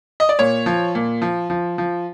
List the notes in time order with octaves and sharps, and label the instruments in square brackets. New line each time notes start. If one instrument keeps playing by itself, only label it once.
[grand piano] D#5
D5
A#2 C#5
F3
A#2
F3
F3
F3